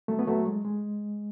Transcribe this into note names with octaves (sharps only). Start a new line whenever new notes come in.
F#3 A3
B3
F#3 A3
G#3
G#3